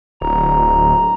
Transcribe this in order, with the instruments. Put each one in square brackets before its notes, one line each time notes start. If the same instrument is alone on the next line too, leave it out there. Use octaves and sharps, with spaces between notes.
[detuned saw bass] D1 [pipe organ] A#5